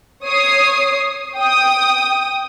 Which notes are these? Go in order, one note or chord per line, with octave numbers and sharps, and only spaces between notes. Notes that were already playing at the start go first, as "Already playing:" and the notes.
C#5 D#6 C7
G5 D#6